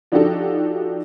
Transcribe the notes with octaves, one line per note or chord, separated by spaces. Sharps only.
F3 D4 D#4 F#4 G4 A4